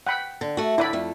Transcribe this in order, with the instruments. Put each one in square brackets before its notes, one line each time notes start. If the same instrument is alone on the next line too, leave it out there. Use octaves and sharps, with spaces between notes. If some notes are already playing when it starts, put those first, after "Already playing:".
[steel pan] F#5 G5 B5
[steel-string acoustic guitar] D3
A3 F#4
[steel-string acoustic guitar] A2 D3 [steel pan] E4 D5 B5
[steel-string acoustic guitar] F2 A3